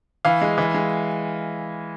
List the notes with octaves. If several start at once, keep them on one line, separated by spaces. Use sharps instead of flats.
E3 F5
G#3
E3
G#3